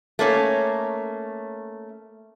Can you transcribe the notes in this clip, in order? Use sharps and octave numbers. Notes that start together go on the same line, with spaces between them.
A3 A#3 C#4 C#5